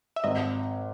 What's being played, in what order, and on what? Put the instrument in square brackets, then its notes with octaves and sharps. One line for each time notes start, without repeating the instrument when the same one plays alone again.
[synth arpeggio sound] E5
[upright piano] G#1 [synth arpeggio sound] D#5